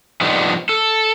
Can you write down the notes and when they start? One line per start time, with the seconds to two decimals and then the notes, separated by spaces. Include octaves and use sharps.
0.21 F3 G3 B3 D4 D#4
0.69 A4